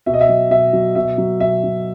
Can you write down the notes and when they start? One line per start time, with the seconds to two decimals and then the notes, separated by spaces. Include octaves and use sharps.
0.06 B2 E5
0.14 D#5
0.21 E5
0.29 F#3
0.50 B2 E5
0.73 F#3
0.95 B2 E5
1.18 F#3
1.40 B2 E5
1.64 F#3